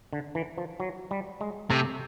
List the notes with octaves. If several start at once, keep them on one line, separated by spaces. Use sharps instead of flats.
D3
E3
F3
F#3
G3
G#3
C3 A3